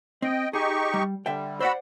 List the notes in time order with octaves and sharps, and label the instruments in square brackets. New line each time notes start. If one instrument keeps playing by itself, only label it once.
[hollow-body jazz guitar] C4 [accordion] D#5 G5
[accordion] D#4 G4 C#6 [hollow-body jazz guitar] G#4
[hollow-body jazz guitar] G3
[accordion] D3 G3 [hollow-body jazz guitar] E5 G5
[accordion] F#4 B5 E6 [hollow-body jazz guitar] C5 D5 F#5